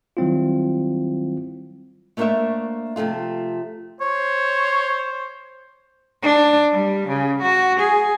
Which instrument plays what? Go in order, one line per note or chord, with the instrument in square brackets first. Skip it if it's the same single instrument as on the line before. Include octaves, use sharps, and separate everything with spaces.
[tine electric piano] D#3 F#3 G3 C4 E4 F4
[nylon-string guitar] A3 A#3 D4 C5 C#5 E5
C3 F3 A3 F4
[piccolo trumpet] C5 [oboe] C#5
[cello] D4
G3
C#3
F#4
G#4